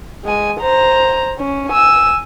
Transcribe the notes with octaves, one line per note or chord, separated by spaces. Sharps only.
G#3 G#5
C5 A#5
C#4
G#5 E6